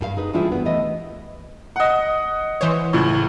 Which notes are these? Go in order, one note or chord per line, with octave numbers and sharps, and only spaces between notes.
G2 G#4 F5
D#4 G#4 B4
E3 G3 D4 E4 F4 G#4
G3 B3
E3 A3 B3 D#5
D#5 F#5
E3 C5 C#5
C#2 A2